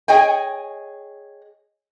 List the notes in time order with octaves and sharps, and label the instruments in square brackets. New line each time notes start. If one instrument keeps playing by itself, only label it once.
[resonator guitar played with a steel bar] G#4 C#5 D#5 G5 G#5